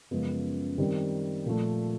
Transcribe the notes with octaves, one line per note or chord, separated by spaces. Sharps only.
F#2 C#3 F3 G#3 B3
D#3 G3 C4
A#2 F3 A3